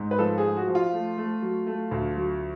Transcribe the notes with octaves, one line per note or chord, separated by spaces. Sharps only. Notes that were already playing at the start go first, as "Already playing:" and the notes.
Already playing: G#2
B4
F3 A4
G#4
F3
F#4
F3
F4
A3
A3
F#3
A3
D2
F#3